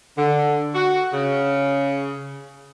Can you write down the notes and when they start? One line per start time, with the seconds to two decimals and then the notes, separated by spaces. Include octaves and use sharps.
0.18 D3
0.74 F#4
1.13 C#3